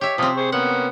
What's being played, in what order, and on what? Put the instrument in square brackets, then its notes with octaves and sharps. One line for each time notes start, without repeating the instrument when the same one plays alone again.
[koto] G4 E5 [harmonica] C#5
[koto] C3 C4 [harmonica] F3 C#4 D#6
[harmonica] G#4 C5 C#6
[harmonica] A#3 B3 C#4 [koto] F#5